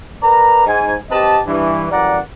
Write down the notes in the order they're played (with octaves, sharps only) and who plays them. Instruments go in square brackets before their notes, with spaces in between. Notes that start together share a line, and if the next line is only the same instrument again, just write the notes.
[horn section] A#4 B4 D5 A#5
G#2 G#5
C4 G4 B4 D#5 A5
G2 E3
F#2 E3 G3 D5 F#5 A#5